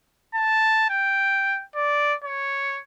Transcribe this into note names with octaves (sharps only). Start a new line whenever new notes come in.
A5
G5
D5
C#5